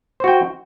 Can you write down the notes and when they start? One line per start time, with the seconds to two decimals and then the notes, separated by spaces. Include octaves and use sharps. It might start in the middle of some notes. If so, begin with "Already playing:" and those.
0.20 C5
0.24 F#4
0.28 G5